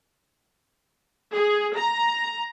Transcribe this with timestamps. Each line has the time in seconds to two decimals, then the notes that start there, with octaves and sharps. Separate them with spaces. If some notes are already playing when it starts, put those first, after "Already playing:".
1.34 G#4
1.78 A#5